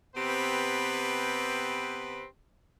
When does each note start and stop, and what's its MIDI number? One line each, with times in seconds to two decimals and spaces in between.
0.16 2.25 48
0.16 2.25 59
0.16 2.25 60
0.16 2.25 67
0.16 2.25 71